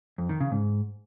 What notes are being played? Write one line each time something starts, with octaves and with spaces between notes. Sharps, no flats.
F2
D#3
C#3
G#2